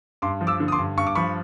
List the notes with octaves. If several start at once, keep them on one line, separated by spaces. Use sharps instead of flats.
G2 C6 D6
F3
D6 E6
D3
D#6
C6 D6
G2
G2 C#6
D6
F3 B5 C#6